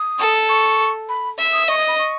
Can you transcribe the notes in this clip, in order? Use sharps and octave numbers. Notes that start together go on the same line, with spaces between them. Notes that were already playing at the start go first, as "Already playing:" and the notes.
Already playing: D#6
A4
C#6
B5
E5
D#6
D#5 C#6
D#6
B5
C#6